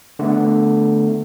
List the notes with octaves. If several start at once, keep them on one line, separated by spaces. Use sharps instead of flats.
D3 A3 B3